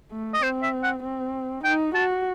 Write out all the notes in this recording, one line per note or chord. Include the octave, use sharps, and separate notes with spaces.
A3
D#5
C4 C5
E5
F#5
C4
D#4 G5
F#4 A5